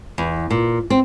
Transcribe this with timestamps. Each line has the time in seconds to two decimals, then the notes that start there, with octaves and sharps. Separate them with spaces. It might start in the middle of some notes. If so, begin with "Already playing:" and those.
0.18 E2
0.51 A#2
0.90 C4